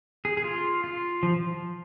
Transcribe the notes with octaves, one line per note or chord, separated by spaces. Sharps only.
G#4
G#4
F4
F4
F3